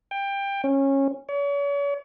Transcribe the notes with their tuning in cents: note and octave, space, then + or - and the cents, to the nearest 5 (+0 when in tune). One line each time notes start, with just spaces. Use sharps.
G5 +20
C#4 -20
C#5 +40